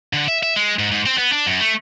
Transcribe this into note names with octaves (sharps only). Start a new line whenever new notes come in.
D3
E5
E5
G#3
G#2
G#2
C4
B3
D4
F#2
A3